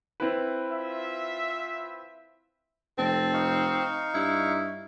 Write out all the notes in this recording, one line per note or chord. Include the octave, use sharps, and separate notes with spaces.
C4 E4 B4
F4 E5
F1 C4 A4
D#4 F5 C#6
G2 E4